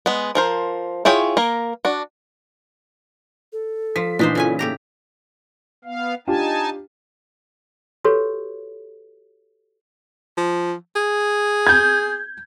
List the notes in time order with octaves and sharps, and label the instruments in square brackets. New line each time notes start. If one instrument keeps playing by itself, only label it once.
[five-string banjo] G#3 B3
F3 A#4 C5
E4 F4 G#4 C#5 G5
A#3 A#4
D4 F#4
[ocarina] A4
[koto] F3 [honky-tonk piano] B6
[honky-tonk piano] A#2 E3 B6 [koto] D4 D#4 C5
[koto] C#3 C#4 G#5 [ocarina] A4
[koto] A2 G4 A#5 [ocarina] A#3
[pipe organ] B3 F5
[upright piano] D4 F4 G4 [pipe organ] D#4 G#5 A5
[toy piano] F#4 G4 A4 B4 C#5
[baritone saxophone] F3
G#4
[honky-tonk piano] G6 G#6